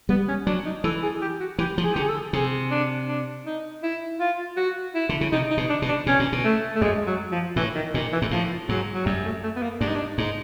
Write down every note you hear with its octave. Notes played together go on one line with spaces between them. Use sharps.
G3 B3
C#4
F#3 D4
D#4
E3 A4
G#4
G4
F#4
E3 G4
F3
G#4
D3 G4
G#4
A4
C3 G#4
D4
D4
D#4
E4
F4
F#4
E4
D3
C#3
C3 D#4
D#4
B2
D4
B2
D4
B2 C#4
A#2
B2
A3
A3
F#2 G#3
F#3
F3
A2 E3
D#3
A#2 D#3
E3
G#2
A2 F3
G#2 F#3
F#3
F#2 G3
A3
A3
B3
A#3
G2 D4
D#4
D4
G#2 D#4